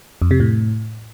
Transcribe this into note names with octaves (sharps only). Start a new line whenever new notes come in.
F2
C3
A2